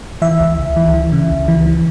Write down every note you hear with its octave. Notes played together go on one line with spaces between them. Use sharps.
E3 E5
C#2
C#2
E3
E3
C#3
C#2
E3
E3